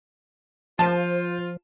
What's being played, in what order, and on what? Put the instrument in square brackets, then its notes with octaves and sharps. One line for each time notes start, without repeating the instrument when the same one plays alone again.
[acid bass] F3 [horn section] F4 [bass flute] C5 [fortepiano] A5